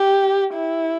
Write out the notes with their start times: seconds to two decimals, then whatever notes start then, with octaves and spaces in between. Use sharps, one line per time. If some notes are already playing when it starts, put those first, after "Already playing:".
Already playing: G4
0.53 E4